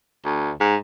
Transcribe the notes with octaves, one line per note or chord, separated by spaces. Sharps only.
D2
G#2